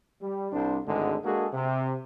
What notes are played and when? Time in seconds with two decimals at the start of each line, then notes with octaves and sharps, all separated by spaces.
0.22 G3
0.53 C2 D4 C5
0.86 G#1 D2 A2 D3 G#3
1.25 G#3 A#3 D4 F#4 G#4 A4
1.53 C3